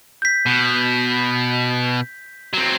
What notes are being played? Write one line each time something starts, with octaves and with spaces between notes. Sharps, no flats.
G6 B6
B2
F#3 C4